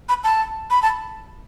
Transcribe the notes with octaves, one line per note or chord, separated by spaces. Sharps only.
B5
A5
B5
A5